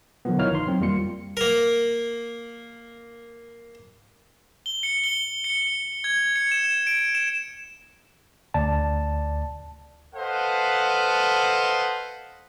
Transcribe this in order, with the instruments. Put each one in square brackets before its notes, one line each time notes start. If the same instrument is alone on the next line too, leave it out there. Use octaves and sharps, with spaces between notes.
[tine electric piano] B2 D3 D#3 F3 F#3 B3
D#4 E4 A#4 C#5 F5 F6
G1 D#3 D#4 C6
F#3 C4
F2 G3 A#3 F4 C6 C#7
[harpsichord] A#3 A#4
[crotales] G7
C#7
G7
C#7
G#6
C#7
E7
D7
E7
[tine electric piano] D2 D5 A5
[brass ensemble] A4 B4 C5 D#5 F5 F#5